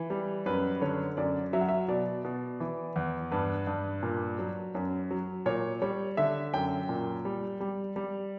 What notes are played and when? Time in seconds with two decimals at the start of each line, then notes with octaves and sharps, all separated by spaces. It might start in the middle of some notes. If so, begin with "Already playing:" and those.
Already playing: E3
0.10 G3
0.46 F#2 B4
0.81 D3 C#5
1.17 F#2 D5
1.53 F#3 E5
1.61 F#5
1.69 E5
1.88 B2 D5
2.24 B2
2.60 E3
2.96 E2
3.31 G2 B4
3.67 G2
4.03 A#2
4.39 F#3
4.75 F#2
5.11 F#3
5.46 A#2 C#5
5.82 G3 C#5
6.17 D3 E5
6.53 F#2 G5
6.89 A#2
7.25 G3
7.60 G3
7.96 G3